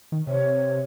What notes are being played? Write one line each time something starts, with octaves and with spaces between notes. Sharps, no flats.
D#3
C3 C#5